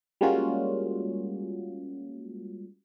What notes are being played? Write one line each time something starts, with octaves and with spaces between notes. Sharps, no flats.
G3 G#3 A#3 C#4 F4 F#4